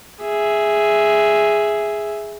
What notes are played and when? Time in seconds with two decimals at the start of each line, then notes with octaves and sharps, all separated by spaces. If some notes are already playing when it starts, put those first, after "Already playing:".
0.23 G#4 E5